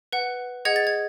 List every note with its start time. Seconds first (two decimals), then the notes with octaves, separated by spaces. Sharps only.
0.12 B4 F#5
0.65 G#4 D#5 F#5 G#6
0.76 A6
0.87 G#6